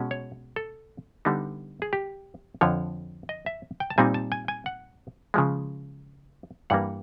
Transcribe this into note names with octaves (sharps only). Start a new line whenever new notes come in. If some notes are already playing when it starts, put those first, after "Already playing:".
Already playing: B2 G#3 C#4
C#5
A4
D3 G3 B3 D#4
G#4
G4
F2 D3 F3 C#5
D#5
E5
G5
A5
A#2 G3 C4 D#4 G#5
A5
G#5
G#5
F#5
C#3 F3 G#3
G2 E3 G3 A#3 F#5